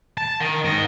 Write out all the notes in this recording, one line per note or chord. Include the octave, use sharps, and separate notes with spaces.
A5
D#3
G#2 D#5